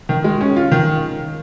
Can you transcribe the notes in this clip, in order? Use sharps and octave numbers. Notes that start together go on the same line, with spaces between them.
D#3
G#3
C#4
F4
D#3